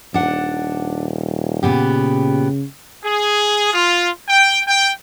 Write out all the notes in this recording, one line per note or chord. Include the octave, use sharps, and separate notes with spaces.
D#1 D4 F#5
A#2 C#3 B3 G4
G#4
F4
G5
G5